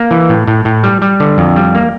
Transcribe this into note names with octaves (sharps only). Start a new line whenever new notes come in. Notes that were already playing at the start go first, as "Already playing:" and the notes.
Already playing: A#3
E3
A2
A2
A2
G3
G3
D3
F2
G3
A#3